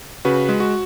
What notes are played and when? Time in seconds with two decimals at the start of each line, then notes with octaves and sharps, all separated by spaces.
0.25 C#3 F#4 B4
0.49 G#3
0.60 F#4